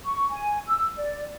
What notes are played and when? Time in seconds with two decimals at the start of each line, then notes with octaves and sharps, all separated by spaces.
0.05 C#6
0.30 G#5
0.67 E6
0.97 D5